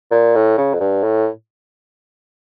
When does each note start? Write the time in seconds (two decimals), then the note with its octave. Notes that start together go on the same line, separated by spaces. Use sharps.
0.11 A#2
0.35 A2
0.58 C#3
0.74 F2
0.81 G2
1.03 A2